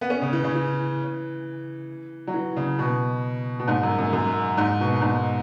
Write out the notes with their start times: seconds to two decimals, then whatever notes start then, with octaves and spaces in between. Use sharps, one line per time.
0.01 B3
0.10 C#4
0.22 C#3
0.33 E3
0.44 C#3
0.55 E3
2.27 F#3
2.34 E3
2.56 C#3
2.79 B2
3.60 B2
3.67 G#2
3.83 F#2
3.98 F#2
4.13 F#2
4.57 G#2
4.80 B2
5.02 G#2